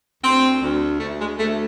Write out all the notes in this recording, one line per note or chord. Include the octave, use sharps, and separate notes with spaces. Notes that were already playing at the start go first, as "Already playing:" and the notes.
D2 C4
D2
D2 A3
G#3
D2 A3